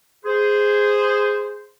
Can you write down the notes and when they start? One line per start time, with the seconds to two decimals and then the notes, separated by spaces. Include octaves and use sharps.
0.25 G#4 C5